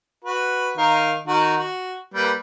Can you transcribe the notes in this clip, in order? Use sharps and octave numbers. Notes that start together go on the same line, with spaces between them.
F#4 B4
D#3 A#4 F5
D#3 F#4
F#4
G3 A#3 B4